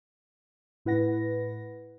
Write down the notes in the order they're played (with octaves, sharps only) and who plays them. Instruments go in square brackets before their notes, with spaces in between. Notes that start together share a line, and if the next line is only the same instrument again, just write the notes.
[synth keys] A2 E4 B4 F#5 A#6